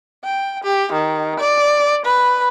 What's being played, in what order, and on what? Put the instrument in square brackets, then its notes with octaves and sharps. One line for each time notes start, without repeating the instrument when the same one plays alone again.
[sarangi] G5
G4
D#3
D5
B4